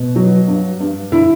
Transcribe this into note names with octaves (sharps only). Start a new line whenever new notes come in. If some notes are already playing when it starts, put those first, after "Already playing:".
Already playing: B2
F#3
G2
G2
D3 E4